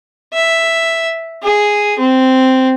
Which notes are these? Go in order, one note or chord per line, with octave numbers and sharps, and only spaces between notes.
E5
G#4
C4